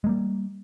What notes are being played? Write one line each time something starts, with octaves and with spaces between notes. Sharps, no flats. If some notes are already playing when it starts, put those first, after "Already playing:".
G3 G#3 A#3